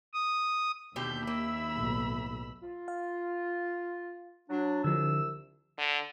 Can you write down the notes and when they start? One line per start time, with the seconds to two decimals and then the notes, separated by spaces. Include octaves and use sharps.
0.13 D#6
0.96 D#2 B2 D3 G4 E5 E6 G6
1.27 A#3 B5 E6
1.75 B1 A2
2.63 F4
2.88 F5
4.50 F#3 D4
4.84 C2 D3 F3 E6
5.78 D3